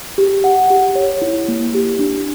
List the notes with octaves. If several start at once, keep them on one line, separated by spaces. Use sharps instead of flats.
G4
F#5
G4
C#5
E4
A#3
G4
D4